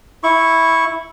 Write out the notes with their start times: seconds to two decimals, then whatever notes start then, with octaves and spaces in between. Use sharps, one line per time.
0.23 E4 C#6